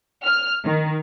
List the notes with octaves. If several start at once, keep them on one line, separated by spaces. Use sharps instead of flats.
F6
D#3